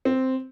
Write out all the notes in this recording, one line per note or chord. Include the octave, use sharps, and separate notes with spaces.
C4